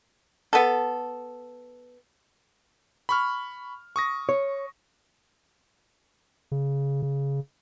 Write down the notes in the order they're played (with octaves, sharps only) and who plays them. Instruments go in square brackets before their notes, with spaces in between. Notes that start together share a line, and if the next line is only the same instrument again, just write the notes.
[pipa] B3 A4
[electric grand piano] B5 C#6 F6
C#6 D#6 A#6
[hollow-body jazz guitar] C#5
[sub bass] C#3
C#3